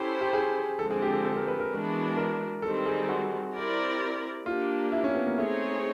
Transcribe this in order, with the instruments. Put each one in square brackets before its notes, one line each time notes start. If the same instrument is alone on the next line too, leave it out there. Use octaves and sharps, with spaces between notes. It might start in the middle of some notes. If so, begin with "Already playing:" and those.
Already playing: [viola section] C#4 E4 A4 C5 [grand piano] G4
[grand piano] G4
G#4
[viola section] D3 F3 G#3 C4 [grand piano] A4
[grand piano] G#4
G4
A4
A4
A#4
B4
A#4
[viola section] E3 G#3 B3 D4 F#4
[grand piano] A#4
[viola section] D#3 G3 C4 [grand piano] A4
[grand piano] G#4
F#4
[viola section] C4 E4 G4 A#4 D5
[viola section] A#3 D4 G4 [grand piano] F4
[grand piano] E4
C#4
B3
A#3
[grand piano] A3 [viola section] C4 D#4 G#4 C#5